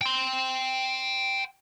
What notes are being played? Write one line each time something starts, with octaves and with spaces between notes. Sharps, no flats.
G5 C6